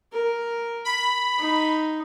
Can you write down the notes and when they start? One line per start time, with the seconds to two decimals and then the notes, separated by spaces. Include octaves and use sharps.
0.12 A#4
0.85 B5
1.39 D#4